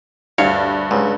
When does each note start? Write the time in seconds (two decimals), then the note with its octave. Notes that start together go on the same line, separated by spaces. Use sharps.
0.38 D2 G2 C#5 F5
0.91 C#2 G#2